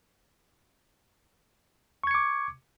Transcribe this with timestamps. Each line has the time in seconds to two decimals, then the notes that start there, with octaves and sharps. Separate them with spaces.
2.04 C#6
2.07 G#6
2.11 C#7
2.15 D6